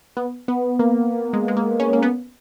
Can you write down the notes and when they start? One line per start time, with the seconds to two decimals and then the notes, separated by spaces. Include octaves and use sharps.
0.17 B3
0.48 B3
0.79 A#3
1.33 G#3
1.48 G#3
1.57 A#3
1.80 C#4
1.93 A#3
2.03 B3